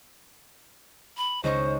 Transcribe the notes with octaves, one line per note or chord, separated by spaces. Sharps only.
B5
C#2 D#4 C5 C#6